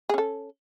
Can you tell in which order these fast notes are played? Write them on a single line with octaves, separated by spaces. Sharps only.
G#4 C#4 A4